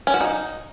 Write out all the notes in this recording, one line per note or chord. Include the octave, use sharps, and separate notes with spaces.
C#4
F#4
D#4